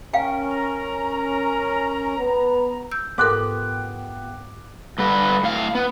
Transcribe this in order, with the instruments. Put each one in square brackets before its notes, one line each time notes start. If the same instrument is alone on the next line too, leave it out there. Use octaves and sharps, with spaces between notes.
[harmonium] C#4 A#4 [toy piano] F5 G5
[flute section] A#5
[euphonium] B3
[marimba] E6 G6
[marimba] G#2 A4 A#4 [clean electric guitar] B3 F4 G4 [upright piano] D6 F#6
[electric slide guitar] G2 D3 B4
A2 F5
B3